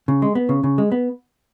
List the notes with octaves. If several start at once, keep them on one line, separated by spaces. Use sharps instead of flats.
C#3
G#3
B3
C#3
C#3
G#3
B3